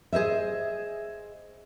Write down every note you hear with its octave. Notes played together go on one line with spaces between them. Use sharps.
G#4 C5 D#5 E5